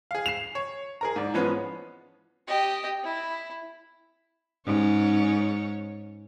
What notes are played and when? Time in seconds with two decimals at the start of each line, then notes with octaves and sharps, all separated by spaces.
0.11 G#4 F5
0.26 C7 E7 F7
0.55 C#5
1.01 G#4 A#4 A#5
1.16 G#2 D5
1.34 E3 F3 G#3 B3 C#4 B4
2.47 G4 D#5
3.04 E4
4.66 G#2 C#4 C#5